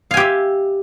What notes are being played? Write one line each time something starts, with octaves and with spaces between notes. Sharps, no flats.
G4 E5 F5 G#5